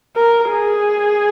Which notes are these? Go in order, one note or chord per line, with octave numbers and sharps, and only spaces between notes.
A#4
G#4